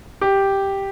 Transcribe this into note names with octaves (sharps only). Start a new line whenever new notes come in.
G4